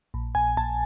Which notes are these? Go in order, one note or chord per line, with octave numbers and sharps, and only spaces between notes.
A#1
A#1 G#5
A#1 A5